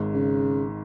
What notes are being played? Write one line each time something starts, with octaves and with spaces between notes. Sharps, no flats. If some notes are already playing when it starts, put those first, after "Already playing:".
Already playing: G#1 G#2
C#3